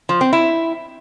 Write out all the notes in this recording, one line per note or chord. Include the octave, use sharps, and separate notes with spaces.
F3
C4
E4